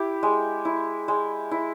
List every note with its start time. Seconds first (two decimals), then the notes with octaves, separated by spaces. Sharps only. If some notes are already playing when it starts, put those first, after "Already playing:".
Already playing: E4 G4
0.23 G#3
0.65 E4
1.08 G#3
1.51 E4